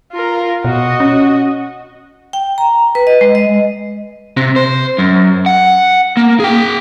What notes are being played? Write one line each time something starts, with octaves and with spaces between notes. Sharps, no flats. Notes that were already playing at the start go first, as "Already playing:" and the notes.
F4 A#4
B2 F#4 D#5
C#4
G5
A#5
B4
D#5
G#3
D#5
C3
C5
F#2
F#5
A#3
G#4 G5